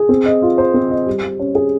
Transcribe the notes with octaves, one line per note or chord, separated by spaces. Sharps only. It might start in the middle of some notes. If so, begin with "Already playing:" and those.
Already playing: G#4
C4
D#5
F4
C5
C4
D#5
G3
G3
C#4
G#4